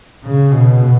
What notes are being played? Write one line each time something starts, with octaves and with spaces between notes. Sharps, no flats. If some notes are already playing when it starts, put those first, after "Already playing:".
C#3
B2